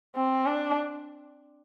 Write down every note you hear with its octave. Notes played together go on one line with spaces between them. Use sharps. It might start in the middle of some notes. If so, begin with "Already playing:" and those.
C4
D4